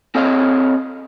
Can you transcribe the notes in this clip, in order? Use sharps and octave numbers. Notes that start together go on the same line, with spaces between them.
C4 A4 C#5 D#5 F5